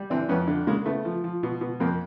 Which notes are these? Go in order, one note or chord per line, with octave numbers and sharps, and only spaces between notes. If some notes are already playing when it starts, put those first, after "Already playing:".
Already playing: G3
E3 C4 D4
F2 B3 C#4
D3
C#3 G#3 A#3
C#3 A3 B3
F3
F3
B2
B2
F2 A#3 C4